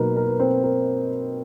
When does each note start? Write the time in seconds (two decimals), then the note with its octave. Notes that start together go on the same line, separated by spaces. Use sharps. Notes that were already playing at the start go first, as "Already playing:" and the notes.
Already playing: B2 F#3 A#3 D#4 A#4 B4
0.17 A#4
0.28 B4
0.40 C4 C5
0.63 A#4